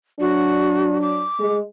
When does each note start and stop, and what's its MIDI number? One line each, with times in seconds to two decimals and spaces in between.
0.20 1.26 54
0.20 1.26 62
0.20 1.00 66
1.02 1.56 86
1.39 1.60 56